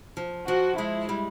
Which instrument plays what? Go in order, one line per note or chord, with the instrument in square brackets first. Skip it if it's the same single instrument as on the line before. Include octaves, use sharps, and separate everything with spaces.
[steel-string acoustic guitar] F3
[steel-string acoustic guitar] F3 [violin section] F#4
[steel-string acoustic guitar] G#3 [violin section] E4
[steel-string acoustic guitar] G3